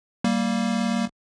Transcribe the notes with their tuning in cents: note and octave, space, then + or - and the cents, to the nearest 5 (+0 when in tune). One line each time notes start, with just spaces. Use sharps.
G3 -15 A#3 +0